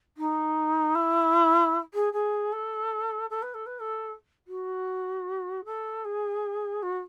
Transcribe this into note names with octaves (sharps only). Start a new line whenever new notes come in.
D#4
E4
G#4
G#4
A4
A4
B4
A4
B4
A4
F#4
A4
G#4
F#4